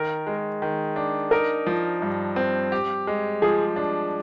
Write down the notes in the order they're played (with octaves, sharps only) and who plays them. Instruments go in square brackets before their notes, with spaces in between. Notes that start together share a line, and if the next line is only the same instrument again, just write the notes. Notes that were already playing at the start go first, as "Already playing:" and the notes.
Already playing: [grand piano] D#3 [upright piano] A#4
[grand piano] G#3
D#3
D4
[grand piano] D#4 [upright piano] A#4
[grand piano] F3
G2
C4
G4
G#3
[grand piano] F3 [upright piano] G#4
[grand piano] D4